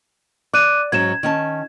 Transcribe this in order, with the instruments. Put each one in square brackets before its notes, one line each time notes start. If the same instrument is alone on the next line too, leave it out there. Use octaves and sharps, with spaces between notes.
[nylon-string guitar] D5 [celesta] D6 F#6 D#7
[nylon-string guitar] G#2 F#3 C#4 [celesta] G#6 E7
[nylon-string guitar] D#3 C#4 A5